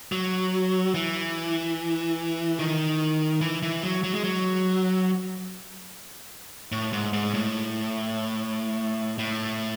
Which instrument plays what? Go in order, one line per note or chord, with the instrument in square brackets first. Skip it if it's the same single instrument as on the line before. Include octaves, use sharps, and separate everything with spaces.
[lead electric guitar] F#3
E3
D#3
E3
E3
F#3
F#3
G#3
F#3
A2
G#2
G#2
A2
A2